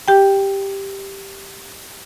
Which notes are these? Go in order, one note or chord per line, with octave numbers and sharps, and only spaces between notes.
G4 G5